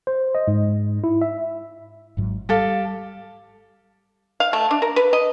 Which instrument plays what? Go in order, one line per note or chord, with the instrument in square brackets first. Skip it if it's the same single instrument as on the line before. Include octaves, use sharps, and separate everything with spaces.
[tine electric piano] C5
D#5
G#2
E4
E5
[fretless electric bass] G#1 G#2 F#3
[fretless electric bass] G3 [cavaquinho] G4 A4 F5
[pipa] F5
A3
D4
A#4
B4
D#5